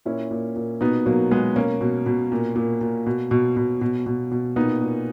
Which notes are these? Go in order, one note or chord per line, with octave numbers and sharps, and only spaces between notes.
A#2 C#4 E4
A#2
A#2
B2 B3 D#4
B2 F#3 A#3
B2 G#3 B3
B2 A#3 C#4
B2
B2
A#2
A#2
A#2
B2
B2
B2
B2
B2
B2
A#2 B3 D#4
A#2